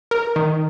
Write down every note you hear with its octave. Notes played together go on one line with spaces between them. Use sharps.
A#4
D#3